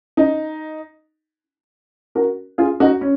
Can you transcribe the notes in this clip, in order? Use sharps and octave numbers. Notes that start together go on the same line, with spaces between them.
D#4
F#4 A#4
F4 G#4
D#4 F#4
C#4